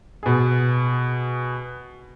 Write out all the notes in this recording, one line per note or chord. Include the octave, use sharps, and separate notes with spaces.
B2 G#4